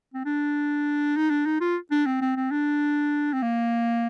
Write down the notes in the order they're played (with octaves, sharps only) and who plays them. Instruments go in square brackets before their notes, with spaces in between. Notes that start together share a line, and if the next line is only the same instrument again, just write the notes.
[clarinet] C4
D4
D#4
D4
D#4
F4
D4
C4
C4
C4
D4
C4
A#3